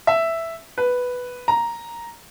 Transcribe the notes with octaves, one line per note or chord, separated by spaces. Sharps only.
E5
B4
A#5